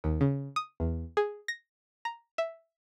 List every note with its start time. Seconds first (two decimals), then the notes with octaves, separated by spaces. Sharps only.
0.04 D#2
0.21 C#3
0.56 D#6
0.80 E2
1.17 G#4
1.48 A#6
2.05 A#5
2.38 E5